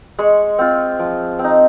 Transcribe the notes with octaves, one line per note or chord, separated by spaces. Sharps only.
G#3 C#6
C4 F4
F3
C4
D#4